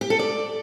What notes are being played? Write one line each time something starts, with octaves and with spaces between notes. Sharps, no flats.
G4
A4
D5